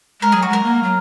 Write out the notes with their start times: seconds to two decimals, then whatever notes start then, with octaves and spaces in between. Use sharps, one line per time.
0.21 G#3 A#4
0.32 F#3 G#4
0.43 F#4
0.49 G#3 A#4
0.63 A#3
0.83 F#3